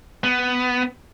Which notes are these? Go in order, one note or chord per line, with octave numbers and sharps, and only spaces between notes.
B3